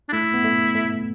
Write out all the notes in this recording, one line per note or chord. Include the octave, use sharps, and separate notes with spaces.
D4
A3 E4
B3
A3
A3